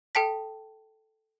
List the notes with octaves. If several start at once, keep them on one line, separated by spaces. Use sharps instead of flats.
A4 G5 A5 B6